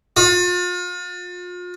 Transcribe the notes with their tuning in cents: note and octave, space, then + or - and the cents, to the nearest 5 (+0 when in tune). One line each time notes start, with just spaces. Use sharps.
F4 +40